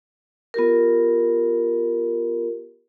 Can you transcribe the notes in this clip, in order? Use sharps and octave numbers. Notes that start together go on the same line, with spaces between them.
B3 F4 G4 A#4